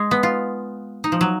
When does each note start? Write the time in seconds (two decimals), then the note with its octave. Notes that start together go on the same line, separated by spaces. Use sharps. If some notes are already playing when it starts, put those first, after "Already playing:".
Already playing: G#3
0.11 B3
0.23 F4
1.04 D#4
1.12 F3
1.21 F#3